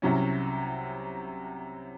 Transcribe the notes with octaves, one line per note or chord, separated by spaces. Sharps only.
C2 C3 F#3 C#4